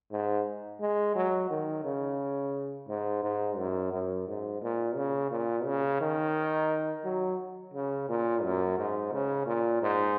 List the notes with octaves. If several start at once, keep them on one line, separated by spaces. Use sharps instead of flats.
G#2
G#3
F#3
D#3
C#3
G#2
G#2
F#2
F#2
G#2
A#2
C#3
A#2
C#3
D#3
F#3
C#3
A#2
F#2
G#2
C#3
A#2
G#2